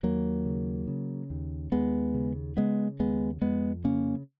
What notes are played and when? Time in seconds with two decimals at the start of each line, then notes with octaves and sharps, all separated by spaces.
0.03 D#2 F#3 A#3
0.45 C#3
0.87 C#3
1.30 D#2
1.72 D#2 G#3 B3
2.14 C#3
2.57 C#3 G#3 B3
2.99 D#2 G#3 B3
3.42 F2 G#3 B3
3.84 C#3 A#3 C#4